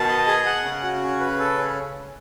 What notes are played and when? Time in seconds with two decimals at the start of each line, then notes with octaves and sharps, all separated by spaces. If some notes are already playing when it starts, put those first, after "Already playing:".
Already playing: B2 D#3 A5
0.08 D#5
0.27 G#4
0.46 F#5
0.64 C#3 C#4
0.83 F#4
1.02 C#4
1.20 B4
1.39 A4
1.58 C#4